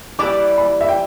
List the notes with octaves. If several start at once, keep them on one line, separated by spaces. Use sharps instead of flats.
E3 G3 E4 G4 D5 D6
B5
E5
G5